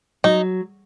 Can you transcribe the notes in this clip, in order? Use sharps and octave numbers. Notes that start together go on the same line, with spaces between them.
F#3 D#4